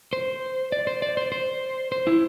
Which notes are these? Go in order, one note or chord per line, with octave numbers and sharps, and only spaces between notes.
C5
D5
C5
D5
C5
C5
C5
E4